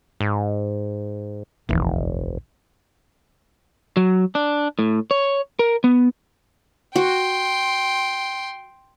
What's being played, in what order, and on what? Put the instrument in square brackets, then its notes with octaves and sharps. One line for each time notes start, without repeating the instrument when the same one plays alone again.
[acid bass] G#2
[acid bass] F1 [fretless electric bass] A#1 D#2 E3
[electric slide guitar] F#3
D4
A2
C#5
A#4
B3
[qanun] F#4 [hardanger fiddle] G5 C6